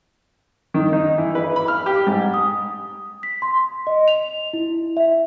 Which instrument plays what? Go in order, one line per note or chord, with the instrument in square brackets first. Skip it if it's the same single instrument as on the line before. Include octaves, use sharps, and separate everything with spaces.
[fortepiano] D#3
D#4
E3
B4
B5
F6
G4
G#2
[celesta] D#6
B6
C6
D#5
F7
E4
E5